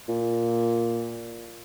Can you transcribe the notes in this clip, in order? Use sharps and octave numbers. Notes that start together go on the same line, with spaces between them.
A#2